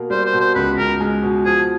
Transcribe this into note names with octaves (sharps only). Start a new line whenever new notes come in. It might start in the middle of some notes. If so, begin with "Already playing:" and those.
Already playing: B2 A#3
G3 C5
C5
B2
C5
C#2 B4
C#2 A#4
G#3
B2
F3 G#4